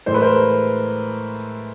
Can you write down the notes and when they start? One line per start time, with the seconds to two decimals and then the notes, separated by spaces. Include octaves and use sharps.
0.06 A2 E3 G#3 C5
0.14 B4
0.22 A#4 C5